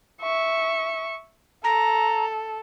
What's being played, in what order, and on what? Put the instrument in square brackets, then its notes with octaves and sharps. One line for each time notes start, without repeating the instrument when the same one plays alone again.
[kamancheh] E5 C#6
[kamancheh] A4 [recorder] A#5